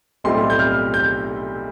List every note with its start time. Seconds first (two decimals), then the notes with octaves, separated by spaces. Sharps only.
0.24 B1 A2 G3 C4 F4 C6
0.50 G6
0.59 F6
0.94 G6